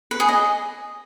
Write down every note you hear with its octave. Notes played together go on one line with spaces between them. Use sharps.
B4
G#4
D#5